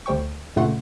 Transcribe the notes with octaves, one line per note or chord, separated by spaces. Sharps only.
D2 G3 C5 G5 C#6
G2 A#2 C#3 A3 F#5 C6